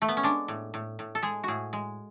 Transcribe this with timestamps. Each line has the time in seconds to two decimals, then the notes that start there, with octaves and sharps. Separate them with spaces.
0.02 A3
0.08 B3
0.17 C#4
0.23 G#3 D4
0.48 A2
0.74 A2
0.99 A2
1.15 A4
1.22 G#3 G#4
1.43 A2 F#4 G#4
1.73 G#3